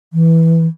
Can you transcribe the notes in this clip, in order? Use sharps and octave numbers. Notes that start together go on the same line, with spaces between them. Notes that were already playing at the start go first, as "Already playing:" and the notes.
E3